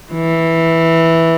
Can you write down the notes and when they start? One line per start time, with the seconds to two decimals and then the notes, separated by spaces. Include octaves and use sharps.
0.13 E3